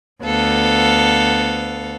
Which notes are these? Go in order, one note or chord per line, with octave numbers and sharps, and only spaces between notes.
D2 B3 A4 F5